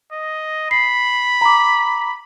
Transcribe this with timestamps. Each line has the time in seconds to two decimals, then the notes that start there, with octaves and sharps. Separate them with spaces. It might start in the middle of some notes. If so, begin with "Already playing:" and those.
0.12 D#5
0.71 B5 C7
1.41 A#5 D6